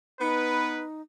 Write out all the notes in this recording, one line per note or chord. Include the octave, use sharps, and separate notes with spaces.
B3 D#4 B4